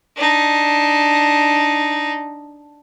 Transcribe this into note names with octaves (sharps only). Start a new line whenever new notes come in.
D4 D#4